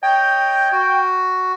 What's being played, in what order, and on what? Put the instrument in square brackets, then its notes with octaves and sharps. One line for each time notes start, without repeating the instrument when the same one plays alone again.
[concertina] C#5 D#5 [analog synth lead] G5
[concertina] F#4